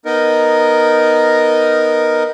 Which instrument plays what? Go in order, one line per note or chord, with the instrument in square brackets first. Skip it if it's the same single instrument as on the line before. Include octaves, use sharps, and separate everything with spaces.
[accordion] B3 D#4 A#4 D#5